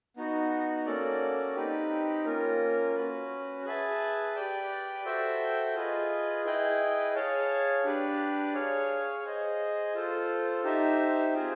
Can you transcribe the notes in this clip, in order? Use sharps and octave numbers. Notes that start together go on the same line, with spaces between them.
B3 D#4 F#4
A#3 C#4 F#4 A4 D5
C4 D#4 G4 B4
A#3 C#4 F4 A#4
C#4 F#4 B4
G#4 B4 E5 A5
G4 B4 D5 G5
F#4 A4 C5 E5 G5
F4 G#4 B4 D#5
E4 G#4 B4 D#5 G5
G#4 C#5 F5 A5
D4 G4 B4 D5
G#4 C#5 F5
G#4 C5 D#5
F4 A4 C5
D#4 G4 C5 E5
C4 F4 G#4 C5